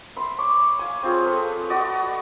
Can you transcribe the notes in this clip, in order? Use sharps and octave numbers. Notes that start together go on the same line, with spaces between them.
E5 B5 C6
C#5 C#6 D6
F5 G#5
C4 F4 G#4 C#5
A4 B4
F#4 D5 D#5